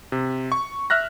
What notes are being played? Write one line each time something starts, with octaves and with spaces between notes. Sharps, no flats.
C3
C#6
E5 F6 F#6 A#6